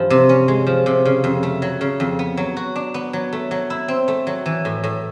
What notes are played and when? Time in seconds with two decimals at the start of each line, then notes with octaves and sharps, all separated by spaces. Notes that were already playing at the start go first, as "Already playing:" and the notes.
Already playing: G2 E3 F3
0.10 C3
0.29 C#4
0.48 G#3
0.67 F3
0.86 C3
1.05 C#3
1.24 F2
1.43 A3
1.62 F#3
1.81 C#3
2.00 F2
2.19 B3
2.37 F#3
2.57 F#4
2.76 D4
2.94 B3
3.13 F#3
3.33 A3
3.51 F#3
3.70 E4
3.88 C4
4.08 A3
4.27 F#3
4.46 E3
4.65 A2
4.84 A2